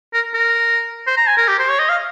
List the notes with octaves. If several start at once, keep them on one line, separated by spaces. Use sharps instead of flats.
A#4
A#4
C5
A#5
G#5
A#4
G4
C5
C#5
D#5
F5